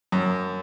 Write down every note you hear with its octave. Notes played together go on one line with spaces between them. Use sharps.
F#2